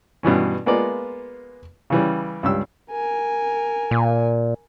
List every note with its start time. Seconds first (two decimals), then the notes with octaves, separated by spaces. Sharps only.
0.23 G2 B2 E3 C#4
0.66 G#3 A#3 B3 F4 D5
1.90 C#3 E3 G3
2.43 C#2 G2 E6
2.91 A#4 G#5
3.91 A#2